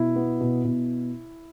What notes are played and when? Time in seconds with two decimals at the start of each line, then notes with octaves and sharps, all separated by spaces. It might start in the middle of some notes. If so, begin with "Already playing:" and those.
Already playing: B2 E4
0.16 B3
0.41 B2
0.64 B2